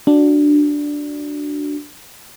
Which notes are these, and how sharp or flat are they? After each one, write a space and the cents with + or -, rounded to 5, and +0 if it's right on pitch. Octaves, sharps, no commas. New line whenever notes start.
D4 +0 F#4 +0